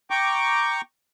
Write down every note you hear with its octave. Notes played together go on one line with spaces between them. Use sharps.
G5 A#5 C#6 D6